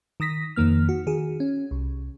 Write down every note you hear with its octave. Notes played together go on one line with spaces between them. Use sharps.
D#3 D#6 A#6 B6
F2 D#3 A#3 F6
F#4
D#3 F#4 G#4
C#4
C2